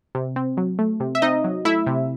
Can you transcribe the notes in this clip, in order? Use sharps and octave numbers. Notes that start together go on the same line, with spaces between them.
C3
C4
F#3
A3
C3
E5
C4 D#4 D#5
F#3
A3 E4 E5
C3